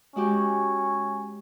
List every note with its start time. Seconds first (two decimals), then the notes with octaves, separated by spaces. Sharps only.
0.16 G#3 C#4 F#4 G4